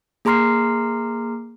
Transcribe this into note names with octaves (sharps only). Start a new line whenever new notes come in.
A#3 G#4 A#5 C6 F6 C7